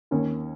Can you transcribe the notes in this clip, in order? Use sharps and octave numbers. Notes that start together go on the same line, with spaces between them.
D#2 D#3 C#4